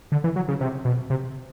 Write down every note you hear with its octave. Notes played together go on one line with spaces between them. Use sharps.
D3
E3
F#3
C#3
C3
B2
C3